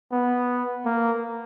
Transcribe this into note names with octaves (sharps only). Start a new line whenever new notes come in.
B3
A#3